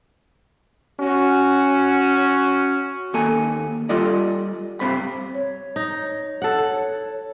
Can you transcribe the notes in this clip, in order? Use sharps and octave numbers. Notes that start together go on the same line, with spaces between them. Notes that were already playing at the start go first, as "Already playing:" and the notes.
C#4 F#4
D#2 A#3 A4 G#5
G3 F4 A4 D5 D#5
G2 C3 C4 B5
C#5
D#4
A4 F#5